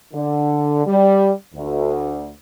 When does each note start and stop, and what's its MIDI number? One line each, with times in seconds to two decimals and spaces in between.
0.13 0.83 50
0.86 1.31 55
1.54 2.31 38